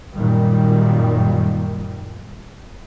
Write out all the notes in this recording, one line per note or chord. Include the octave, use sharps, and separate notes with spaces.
F#2 A#2 D#3 G3